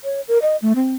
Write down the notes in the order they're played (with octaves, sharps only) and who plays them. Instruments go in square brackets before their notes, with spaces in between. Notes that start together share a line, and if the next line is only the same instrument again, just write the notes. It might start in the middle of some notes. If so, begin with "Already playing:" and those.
[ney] C#5
A#4
D#5
A3
C4